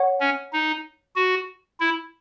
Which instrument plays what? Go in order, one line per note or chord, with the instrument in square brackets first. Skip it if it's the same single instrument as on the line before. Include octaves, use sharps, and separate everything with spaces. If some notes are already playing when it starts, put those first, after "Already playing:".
Already playing: [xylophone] C#5 F#5 C#6
[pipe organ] C#4
D#4
F#4
E4